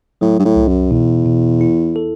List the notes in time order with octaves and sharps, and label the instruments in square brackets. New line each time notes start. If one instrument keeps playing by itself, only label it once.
[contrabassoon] A2 [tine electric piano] F#3
[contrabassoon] G2
A2
[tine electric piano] C2
[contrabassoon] F#2
[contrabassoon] E2 [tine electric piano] B2
[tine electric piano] B2
E4
A4